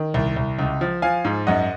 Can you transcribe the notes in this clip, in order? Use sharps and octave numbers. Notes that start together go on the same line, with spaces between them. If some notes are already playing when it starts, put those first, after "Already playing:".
Already playing: D#3
C2
C2
C#2
F3
F3 F5 G#5
G#2
F#2 D#5 F#5